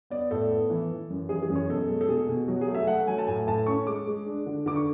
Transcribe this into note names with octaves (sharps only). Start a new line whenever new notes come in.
B3 D5
A2 A4
B3
E3
E3
F#2
E3 G#4
G#4
F#2
C#5
B2 A4
G#3
A4
B2 G#4
B2
F#3 F#4
G#4
A3
E5
A3 F#5
F#3 G#5
A5
A2 G#5
A2 A5
C#4 C#6
G#3 D6
G#3
D4
D3
D3 D6
C#6